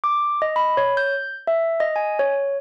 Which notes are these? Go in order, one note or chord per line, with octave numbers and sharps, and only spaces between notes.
D6
D#5
B5
C#5
G6
E5
D#5
G#5
C#5